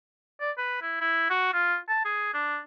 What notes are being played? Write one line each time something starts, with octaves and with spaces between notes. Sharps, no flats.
D5
B4
E4
E4
F#4
F4
A5
G#4
D4